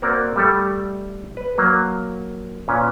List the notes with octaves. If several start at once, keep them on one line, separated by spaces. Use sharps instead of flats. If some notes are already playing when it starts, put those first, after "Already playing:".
A#3 C4 F#4 A#4 D5
G3 A3 G4 A4
B4
F#3 A#3
A#2 C#4 B4